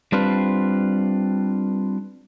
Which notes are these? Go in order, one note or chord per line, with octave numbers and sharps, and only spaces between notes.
G3 C4 D4 F4 B4 C5